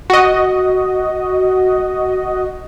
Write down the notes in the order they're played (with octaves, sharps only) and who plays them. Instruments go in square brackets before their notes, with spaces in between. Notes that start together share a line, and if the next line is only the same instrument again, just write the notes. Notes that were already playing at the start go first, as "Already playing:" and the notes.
[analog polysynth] F#4 D#5